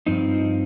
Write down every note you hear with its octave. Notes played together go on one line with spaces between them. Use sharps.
G2 F3 C4 D#4